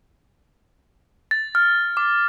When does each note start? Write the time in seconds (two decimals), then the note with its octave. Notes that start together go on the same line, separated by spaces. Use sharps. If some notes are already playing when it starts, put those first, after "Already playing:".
1.31 A6
1.55 F6
1.97 D6